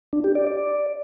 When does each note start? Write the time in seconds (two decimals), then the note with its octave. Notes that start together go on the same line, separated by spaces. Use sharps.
0.13 D4
0.24 G4
0.35 D5
0.47 D5